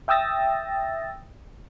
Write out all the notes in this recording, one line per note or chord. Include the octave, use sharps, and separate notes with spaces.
E5 G5 D#6 E6 A6 A#6